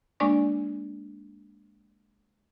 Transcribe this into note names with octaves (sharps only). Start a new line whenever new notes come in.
G#3 A#3 D4 D5 G#5 C#6